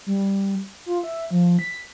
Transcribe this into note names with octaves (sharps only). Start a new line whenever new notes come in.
G3
F4
E5
F3
B6